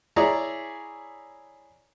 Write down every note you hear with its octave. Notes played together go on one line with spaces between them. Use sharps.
E4 G#4 C#5 D5 A#5